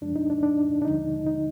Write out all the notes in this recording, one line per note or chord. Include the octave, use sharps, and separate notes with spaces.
F#2 F3 G#3 D4
D#4
D4
D4
D4
D#2 D3 F3 G#3 D#4
D#4